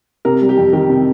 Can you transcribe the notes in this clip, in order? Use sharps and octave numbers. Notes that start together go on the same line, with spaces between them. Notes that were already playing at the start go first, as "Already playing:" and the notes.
C3 A#4
G3
G4
F2
D#3 G4
C3